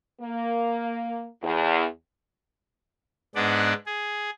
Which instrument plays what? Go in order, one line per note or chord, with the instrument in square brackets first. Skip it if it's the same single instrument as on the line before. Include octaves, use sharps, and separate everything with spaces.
[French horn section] A#3
E2
[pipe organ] G#2 G#3 B3 D4 D5 F#5
G#4